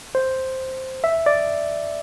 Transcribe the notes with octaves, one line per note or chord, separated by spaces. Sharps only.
C5
E5
D5